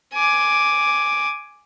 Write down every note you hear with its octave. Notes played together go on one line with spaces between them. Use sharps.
G#5 D6